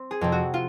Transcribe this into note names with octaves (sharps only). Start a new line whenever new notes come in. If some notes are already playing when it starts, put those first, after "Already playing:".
Already playing: C4
G#4
F2 C3
F#4
F4